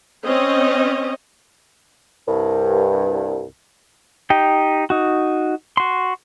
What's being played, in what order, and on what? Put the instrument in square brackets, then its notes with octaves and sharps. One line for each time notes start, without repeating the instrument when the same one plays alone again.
[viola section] C4 C#4 C#5 D#5
[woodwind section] C2 G2
[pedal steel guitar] D#4 G4 G5
D#4 F#4
F#4 C6